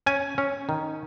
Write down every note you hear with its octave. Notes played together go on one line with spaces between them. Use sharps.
C#4 G#5
C#4
D#3